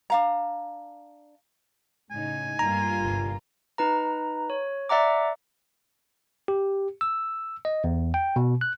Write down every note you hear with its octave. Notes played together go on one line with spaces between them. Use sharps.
D4 F5 A#5
A2 C#3 D#4 G#5
G2 G3 A#3 F4 A#5
G1 C2 G2
D#4 B4 A#5
C#5
D5 E5 F#5 A#5 D6
G4
E6
D#5
E2
G5
B2
F#6